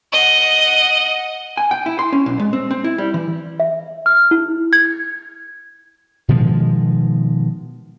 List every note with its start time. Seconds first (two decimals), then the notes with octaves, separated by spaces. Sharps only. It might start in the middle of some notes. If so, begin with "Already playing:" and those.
0.12 D#5 F#5
1.57 G#5
1.71 G5
1.86 E4
1.99 C6
2.13 C#4
2.26 B1
2.40 G#3
2.53 C4
2.71 C4
2.84 E4
2.98 G3
3.14 E3
3.60 E5
4.06 F6
4.31 E4
4.73 G#6
6.28 B2 D#3 F3 G#3